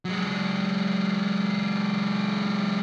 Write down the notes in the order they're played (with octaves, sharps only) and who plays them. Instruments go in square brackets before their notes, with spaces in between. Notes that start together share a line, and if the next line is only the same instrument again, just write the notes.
[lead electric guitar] F#3 G#3